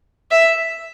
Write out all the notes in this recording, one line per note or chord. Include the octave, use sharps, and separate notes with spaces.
E5